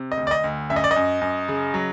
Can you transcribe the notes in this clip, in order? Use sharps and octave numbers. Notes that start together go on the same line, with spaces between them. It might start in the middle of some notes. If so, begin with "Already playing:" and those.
Already playing: C3
D#5
D2
D5
D#5
D2
F#2 E5
D#5
D5
D#5
F#2
F#2
C#3
F#3